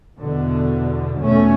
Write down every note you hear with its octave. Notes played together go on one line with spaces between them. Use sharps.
E2 B2 D3
E2 B2 A3 C#4